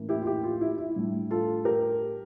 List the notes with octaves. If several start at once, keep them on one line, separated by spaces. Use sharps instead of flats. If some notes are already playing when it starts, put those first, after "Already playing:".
Already playing: A2 E3 A#3 C#4
E4 G4
F4
E4 G4
F4
E4
E4
A2 G3 D4
F4 A4
G4 A#4